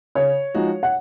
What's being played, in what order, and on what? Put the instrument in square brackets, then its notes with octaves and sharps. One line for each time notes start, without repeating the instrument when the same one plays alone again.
[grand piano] C#3 [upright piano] C#5
[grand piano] F3 G#3 D#4 F#4
[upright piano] F#5